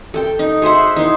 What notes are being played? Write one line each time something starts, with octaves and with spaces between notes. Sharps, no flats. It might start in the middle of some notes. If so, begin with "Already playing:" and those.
A4 G5
D#4
G#4 C5 E5 F#5
D#4 E4 C5